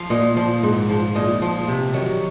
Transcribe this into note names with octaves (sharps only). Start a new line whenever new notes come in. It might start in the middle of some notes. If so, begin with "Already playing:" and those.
Already playing: F3 F5
A#2 D#5
F3
G#2
F3
A#2 D#5
F3
C3
D#3 F#3